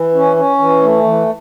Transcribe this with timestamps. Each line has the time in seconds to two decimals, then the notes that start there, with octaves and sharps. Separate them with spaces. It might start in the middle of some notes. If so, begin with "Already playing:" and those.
Already playing: E3
0.15 C#4
0.36 C#4
0.59 E3
0.82 A3
1.03 E3